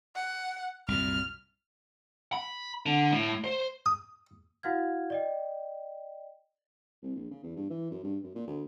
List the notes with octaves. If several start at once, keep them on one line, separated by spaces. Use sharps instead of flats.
F#5
C2 F#2 A#2 F6
B5
D3
A2
C5
D#6
E4 F#4 F5 F#5 F6 G#6
D5 D#5 G5
C2
A#1
C#3
E2
G2
E3
F#2
G2
F#2
A#2
D2